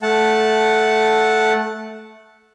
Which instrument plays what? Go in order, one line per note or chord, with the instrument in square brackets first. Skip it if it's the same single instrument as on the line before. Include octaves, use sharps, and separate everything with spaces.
[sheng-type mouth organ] A3 F#5 A5